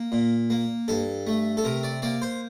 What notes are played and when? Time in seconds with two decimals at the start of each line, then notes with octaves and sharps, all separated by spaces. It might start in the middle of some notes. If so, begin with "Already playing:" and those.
Already playing: A#3
0.12 A#2
0.50 A#3
0.88 G2 A4
1.27 A3
1.57 A4
1.64 C3 A#4
1.83 D5
2.02 A#3 D5
2.22 C5